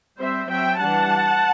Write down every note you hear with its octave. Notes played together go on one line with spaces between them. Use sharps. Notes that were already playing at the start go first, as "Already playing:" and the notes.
G3 C4 C5 E5
F#3 C4 E5 G5
E3 G3 D4 F#5 A5